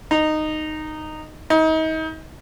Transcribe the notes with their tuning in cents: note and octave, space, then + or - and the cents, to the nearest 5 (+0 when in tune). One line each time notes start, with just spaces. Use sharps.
D#4 -10
D#4 +35